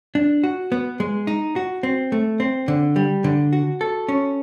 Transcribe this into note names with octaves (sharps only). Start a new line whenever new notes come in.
D4
F#4
B3
G#3
D#4
F#4
C4
A3
C4
D3
G3
D3
F#4
A4
C#4